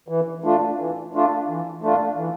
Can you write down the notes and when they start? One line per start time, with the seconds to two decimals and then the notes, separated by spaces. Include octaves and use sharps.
0.08 E3
0.44 A3 D4 F4
0.78 E3
1.13 A3 D4 F4
1.48 E3
1.82 A3 D4 F4
2.17 E3